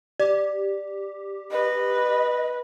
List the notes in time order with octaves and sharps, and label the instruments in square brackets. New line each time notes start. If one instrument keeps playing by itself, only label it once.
[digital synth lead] G4 [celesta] D5
[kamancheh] B4 [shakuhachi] D#5